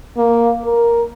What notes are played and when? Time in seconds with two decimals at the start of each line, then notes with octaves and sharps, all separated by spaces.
0.17 A#3
0.65 A#4